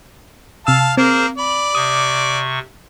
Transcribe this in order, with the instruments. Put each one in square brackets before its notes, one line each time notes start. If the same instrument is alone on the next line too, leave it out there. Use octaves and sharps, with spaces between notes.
[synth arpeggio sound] C3 E6 [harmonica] F5 A5
[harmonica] A#3 [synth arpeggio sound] C4 [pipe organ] G#4 A#4 C5
[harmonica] D5 [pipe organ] B5
[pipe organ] C3 C#6 [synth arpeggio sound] D#6